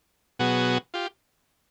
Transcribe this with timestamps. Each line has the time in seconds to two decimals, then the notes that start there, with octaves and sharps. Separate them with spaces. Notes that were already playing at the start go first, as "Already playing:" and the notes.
0.39 B2 F#3 B3 F#4 G#4
0.94 F4 G4